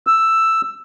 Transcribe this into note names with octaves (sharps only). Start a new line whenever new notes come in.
E6